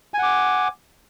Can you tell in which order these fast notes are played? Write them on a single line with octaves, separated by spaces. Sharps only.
G#5 F#5 D6